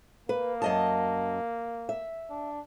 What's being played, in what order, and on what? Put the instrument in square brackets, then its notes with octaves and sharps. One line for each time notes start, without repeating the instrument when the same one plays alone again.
[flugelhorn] A#3 [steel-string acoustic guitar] B4
[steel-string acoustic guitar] F#2 D#5 A5
E5
[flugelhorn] D4